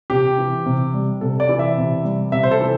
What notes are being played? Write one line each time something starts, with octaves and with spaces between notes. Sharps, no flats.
C3 G4
E3
C3
G3
C3 A4
D5
E3
E5
C3
G3
C3 E5
C5
A4
E3